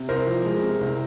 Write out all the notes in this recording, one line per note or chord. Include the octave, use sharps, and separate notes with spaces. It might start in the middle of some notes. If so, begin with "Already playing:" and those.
Already playing: C3
C2 A#4 C5
F3
G#3
C3
C2